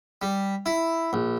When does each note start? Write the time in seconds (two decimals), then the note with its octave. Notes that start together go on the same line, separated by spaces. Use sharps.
0.22 G3
0.66 E4
1.13 A#1